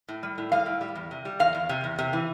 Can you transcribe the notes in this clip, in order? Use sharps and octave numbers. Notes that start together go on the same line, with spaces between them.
A2
G3
A2
G3 F5
A2
G3
E2
C3
G3
E2 F5
E2
C3
E2
C3
E3